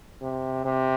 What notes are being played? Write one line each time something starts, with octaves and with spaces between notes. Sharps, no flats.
C3
C3